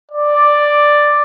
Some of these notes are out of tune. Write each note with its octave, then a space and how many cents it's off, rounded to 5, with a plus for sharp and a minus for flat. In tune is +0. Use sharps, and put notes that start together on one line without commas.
D5 +5